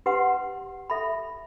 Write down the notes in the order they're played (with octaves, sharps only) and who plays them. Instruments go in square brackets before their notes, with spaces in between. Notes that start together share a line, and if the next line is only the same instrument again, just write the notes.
[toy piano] G4 B4 F#5 C6
A4 E5 B5